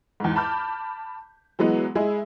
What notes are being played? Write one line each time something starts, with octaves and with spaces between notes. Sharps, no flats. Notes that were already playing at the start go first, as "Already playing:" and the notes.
E2 G#2
A5 B5 D6 F6 G6
E3 F#3 G#3 B3
G#3 E4 G#4